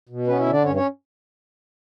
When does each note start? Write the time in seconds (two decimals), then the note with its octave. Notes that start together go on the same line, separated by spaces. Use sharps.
0.09 B2
0.27 B3 C#4 B4
0.39 E4 E5
0.46 D3
0.52 D4 D5
0.64 G2 C#4 C#5
0.76 C#4 C#5